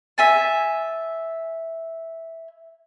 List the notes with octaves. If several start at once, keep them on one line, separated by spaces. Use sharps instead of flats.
E5 G#5 A5